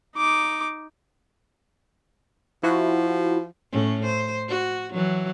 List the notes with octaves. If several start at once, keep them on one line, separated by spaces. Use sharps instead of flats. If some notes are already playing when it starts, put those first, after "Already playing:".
D#4 D6
F3 E4 F#4
A2 C#4
C5
F#4
E3 F#3